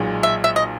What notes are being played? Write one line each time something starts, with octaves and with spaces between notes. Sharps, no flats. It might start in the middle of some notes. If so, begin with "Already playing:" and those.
Already playing: B1 A#2 G#3
E5
E5
D#5